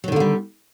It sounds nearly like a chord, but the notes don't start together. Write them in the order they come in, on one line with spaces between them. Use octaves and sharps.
F#3 D#3 D3 A#3 G3